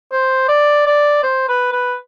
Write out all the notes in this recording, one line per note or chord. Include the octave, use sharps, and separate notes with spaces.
C5
D5
D5
C5
B4
B4